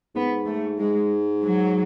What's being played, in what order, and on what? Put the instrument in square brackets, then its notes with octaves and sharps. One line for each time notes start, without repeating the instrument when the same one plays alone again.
[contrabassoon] G#2 [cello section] B3
[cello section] A3
[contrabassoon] G#2 [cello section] G#3
[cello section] F#3